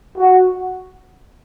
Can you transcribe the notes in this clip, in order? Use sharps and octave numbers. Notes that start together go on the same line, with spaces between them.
F#4